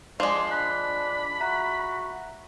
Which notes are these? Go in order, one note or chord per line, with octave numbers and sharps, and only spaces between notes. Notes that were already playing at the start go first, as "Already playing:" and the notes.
F3 G#3 D5 C6 C7
D4 B5 F#6
F#4 E5 A#5 F#6